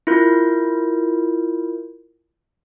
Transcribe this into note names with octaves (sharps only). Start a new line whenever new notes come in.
E4 F4 A#4 G6